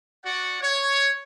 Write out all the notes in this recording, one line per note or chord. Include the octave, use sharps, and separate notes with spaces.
F#4 D5 F#5
C#5